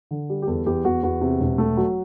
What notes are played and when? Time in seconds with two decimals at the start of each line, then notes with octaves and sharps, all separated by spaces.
0.11 D3
0.30 G3
0.42 G4
0.47 E2 A4
0.66 E2 G4
0.85 E2 F#4
1.03 E2 F#4
1.21 C3
1.41 E1
1.58 A3
1.77 F#3